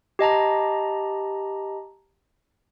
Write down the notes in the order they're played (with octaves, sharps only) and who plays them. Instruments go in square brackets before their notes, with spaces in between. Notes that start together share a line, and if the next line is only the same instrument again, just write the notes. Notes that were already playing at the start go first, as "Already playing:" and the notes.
[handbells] G4 D#5 A5 A#5